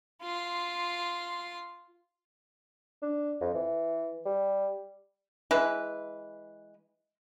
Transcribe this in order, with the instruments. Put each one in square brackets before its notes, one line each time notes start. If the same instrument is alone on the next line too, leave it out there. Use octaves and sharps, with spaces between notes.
[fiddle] F4 C6
[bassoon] D4
F2
E3
G3
[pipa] E3 G#3 E4 B4